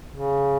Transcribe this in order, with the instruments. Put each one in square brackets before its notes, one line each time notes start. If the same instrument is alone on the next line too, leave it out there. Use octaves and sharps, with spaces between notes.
[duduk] C#3